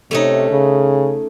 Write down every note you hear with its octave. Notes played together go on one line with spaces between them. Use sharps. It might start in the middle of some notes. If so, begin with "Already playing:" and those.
C3 A3 C#4 D#4
C#3